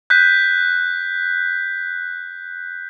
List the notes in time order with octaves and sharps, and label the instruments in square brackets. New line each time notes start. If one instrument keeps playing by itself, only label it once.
[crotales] F#6 G6 B6